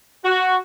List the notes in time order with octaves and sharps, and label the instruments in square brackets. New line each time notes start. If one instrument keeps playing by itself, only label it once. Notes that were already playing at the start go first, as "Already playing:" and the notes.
[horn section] F#4